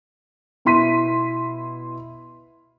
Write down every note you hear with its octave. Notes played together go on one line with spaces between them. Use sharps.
B2 E4 C6 B6 D#7